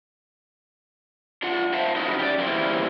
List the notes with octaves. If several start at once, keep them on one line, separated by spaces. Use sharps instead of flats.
D4 F4 F#5
C5 E5 F5 A5
C#4 D#4 E4 F#4
G4 C#5 D5
E2 G3 A#3 C#4 E4 C5